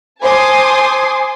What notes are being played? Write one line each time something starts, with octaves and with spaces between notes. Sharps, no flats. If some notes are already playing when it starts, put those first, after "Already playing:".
C5 G#5 A5 C6 D6 D#6